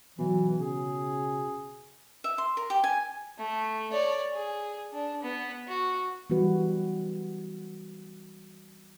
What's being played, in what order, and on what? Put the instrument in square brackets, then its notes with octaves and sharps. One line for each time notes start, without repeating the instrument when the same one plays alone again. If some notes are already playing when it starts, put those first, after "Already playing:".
[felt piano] B2 [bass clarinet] E3 [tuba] F#3
[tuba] C#3 [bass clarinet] G#4
[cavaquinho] E5
C6
A#4
G4
G#5
[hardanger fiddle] A3
C#5 D5
G#4
D4
B3
F#4
[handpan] E3 G3 B3 F#4 B4